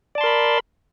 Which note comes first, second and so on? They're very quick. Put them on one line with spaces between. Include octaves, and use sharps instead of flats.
D5 A5 C6 A#4 B5